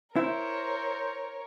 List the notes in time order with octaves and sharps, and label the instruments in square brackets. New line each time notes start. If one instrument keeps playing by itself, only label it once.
[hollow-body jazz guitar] E4 [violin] A#4 C#5 [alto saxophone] C5